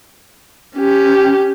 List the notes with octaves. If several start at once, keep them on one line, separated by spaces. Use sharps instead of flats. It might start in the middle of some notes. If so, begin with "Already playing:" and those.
C#4 G4